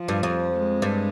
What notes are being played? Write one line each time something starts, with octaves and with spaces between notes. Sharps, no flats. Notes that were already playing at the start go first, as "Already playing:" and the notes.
Already playing: F3
G2
F2
G#3
G2